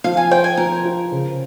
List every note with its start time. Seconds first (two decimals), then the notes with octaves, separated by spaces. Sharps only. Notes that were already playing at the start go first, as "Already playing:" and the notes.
0.04 F3 F5
0.17 G#5
0.31 C5 G5
0.44 G#5
0.57 F3 A#4
0.85 F4
1.12 C#3